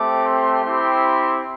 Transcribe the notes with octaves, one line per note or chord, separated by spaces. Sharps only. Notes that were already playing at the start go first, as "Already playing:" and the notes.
Already playing: A3 C4 G4 D6
C6
C4 E4 G4